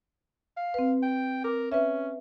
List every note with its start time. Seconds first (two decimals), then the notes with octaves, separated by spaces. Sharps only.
0.57 F5
0.74 C4 B4
1.02 G5
1.44 A#4 D6
1.72 C#4 B4 E5